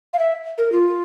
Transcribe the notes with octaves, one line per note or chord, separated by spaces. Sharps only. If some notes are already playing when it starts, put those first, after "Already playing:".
F5
E5
A#4
F4